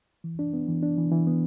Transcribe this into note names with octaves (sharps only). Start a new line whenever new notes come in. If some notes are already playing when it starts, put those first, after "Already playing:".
E3
D4
B3
E3
D4
E3
E3
B3